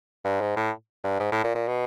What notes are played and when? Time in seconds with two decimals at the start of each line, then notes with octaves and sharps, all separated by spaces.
0.24 G2
0.41 G#2
0.56 A2
1.04 G2
1.20 G#2
1.32 A2
1.44 A#2
1.55 A#2
1.68 B2